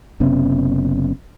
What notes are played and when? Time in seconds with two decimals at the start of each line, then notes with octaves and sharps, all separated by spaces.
0.20 F#1 C3 B3 C#4